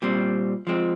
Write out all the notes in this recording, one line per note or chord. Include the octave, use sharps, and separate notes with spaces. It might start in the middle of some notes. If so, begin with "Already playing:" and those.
A#2 G3 C4
F3 G#3 C4